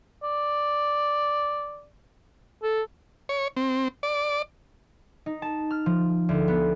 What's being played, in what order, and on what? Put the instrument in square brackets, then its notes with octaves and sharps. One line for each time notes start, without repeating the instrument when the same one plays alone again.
[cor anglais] D5
A4
[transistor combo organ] C#5
C4
D5
[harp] D#4
A5
F6
F3
D2
B3